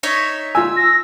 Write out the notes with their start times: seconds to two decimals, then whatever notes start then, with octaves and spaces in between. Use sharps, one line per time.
0.03 D#4 C#5 E5
0.55 F4 G#5 E6
0.76 A#6